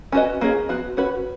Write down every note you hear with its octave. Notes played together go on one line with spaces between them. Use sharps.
C#4 F#4 B4 D#5
A#3 C#4 F4 G#4
F3 B3 F#4
C#4 F#4 B4